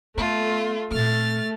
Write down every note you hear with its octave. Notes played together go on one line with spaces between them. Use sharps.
A3 B3 F4
A#2 A3 C4 F6 A6